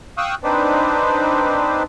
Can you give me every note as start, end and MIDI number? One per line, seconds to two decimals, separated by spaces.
0.18 0.35 77
0.18 0.35 79
0.18 0.35 85
0.18 0.35 87
0.18 0.35 88
0.18 0.35 90
0.44 1.83 60
0.44 1.83 62
0.44 1.83 63
0.44 1.83 71
0.44 1.83 72
0.44 1.83 74